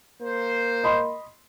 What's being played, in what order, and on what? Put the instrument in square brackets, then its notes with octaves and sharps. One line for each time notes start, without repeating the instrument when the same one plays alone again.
[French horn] A#3 [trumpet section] C5
[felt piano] D#5 B5 C6